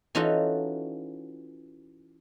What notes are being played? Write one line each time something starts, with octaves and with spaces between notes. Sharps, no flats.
E3 C#4 D#4 F4 F#4 A4